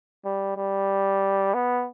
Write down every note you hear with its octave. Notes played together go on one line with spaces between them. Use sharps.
G3
G3
B3